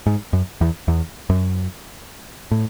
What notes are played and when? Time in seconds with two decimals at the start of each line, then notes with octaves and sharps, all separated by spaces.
0.06 G#2
0.33 F#2
0.61 E2
0.88 E2
1.30 F#2
2.51 A2